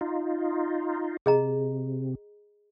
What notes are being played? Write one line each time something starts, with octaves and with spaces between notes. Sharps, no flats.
D#4 F4
C3 G#4 D#5 A#5